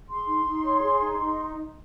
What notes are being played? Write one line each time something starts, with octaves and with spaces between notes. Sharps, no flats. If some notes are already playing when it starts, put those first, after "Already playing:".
G#4 C6
D#4
D#4
C#5
G#4
D#4
D#4